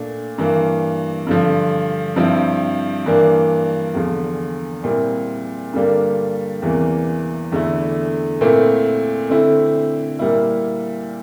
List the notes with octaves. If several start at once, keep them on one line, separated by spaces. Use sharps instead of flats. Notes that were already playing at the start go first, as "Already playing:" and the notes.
Already playing: A#2 A3 D4
G2 E3 A#3
G2 D3 F3
G2 F3 C4 E4
G2 E3 A#3 D4
E2 D3 F3
A#2 G3 C4 E4
G2 D3 G3 A#3 D4
E2 C3 E3 A#3
E2 D3 A3 E4
A#2 A3 C4 E4
D3 A3 C4 E4
A#2 G3 A#3 E4